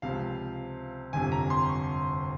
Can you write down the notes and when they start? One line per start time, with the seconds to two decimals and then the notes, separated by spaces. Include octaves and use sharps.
0.02 C#2 C3 F3 C4 F5
1.13 G1 F2 C3 G#5
1.32 A#5
1.50 C6
1.69 C#6